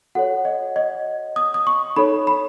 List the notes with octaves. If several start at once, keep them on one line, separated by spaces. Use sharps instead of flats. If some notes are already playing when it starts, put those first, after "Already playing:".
F#4 A4 C#5 F#5
D#5
D#5
D#6
D#6
C#6
D#4 A4 C#5 B5
B5